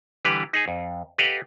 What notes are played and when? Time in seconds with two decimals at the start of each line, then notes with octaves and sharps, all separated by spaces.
0.25 D3 E3 G3 G4 B4
0.53 D#4 G#4 G#5
0.68 F2
1.18 G4 A4 B4 D#5 F5 F#5